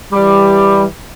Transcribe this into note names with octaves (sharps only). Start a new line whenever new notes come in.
E3 G3